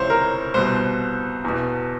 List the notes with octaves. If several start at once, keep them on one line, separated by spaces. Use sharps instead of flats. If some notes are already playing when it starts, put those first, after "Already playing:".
Already playing: C#2 C3 E3 C5 C#5
A#4
C2 B2 C5
E2 B2